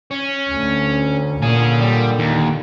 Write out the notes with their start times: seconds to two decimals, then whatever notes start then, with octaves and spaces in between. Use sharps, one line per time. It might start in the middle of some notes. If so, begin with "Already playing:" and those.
0.11 C#4
0.52 D2
1.42 A#2 D3 C#4 G#4
1.81 G3
2.19 D#2